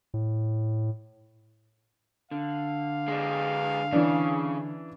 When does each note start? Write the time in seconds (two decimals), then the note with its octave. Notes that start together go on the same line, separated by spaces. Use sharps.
0.14 A2
2.31 D3 F5
3.08 G#3 D4
3.93 C#3 E3 D4